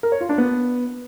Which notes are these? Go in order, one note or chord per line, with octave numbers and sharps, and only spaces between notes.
A#4
C#5
F4
D4
B3